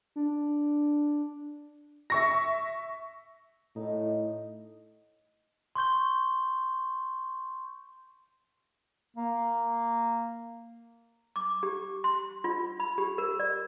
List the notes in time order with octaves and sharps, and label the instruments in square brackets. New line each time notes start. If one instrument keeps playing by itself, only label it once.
[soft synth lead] D4
[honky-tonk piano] E5 C#6 A#6
[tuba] A2 [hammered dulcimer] D#4
[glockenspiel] C6 C#6 G6 G7
[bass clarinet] A#3
[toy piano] D6
G4
C6
F4
B5
G4
A#4
D5